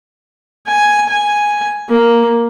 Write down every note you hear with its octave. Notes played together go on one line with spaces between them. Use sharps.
G#5
G#5
A#3